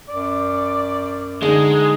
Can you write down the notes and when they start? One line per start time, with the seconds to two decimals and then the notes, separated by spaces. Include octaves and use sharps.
0.09 F#2 D5
1.43 D3 G#3 D#4